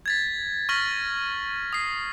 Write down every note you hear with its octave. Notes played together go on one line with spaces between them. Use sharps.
G#6 A6 B6
C#6 F6 A#6 B6 F#7
D#6 C7